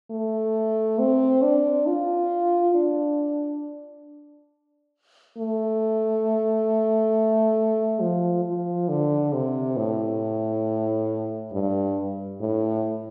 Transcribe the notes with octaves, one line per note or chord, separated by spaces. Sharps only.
A3
C4
D4
F4
D4
A3
F3
F3
D3
C3
A2
G2
A2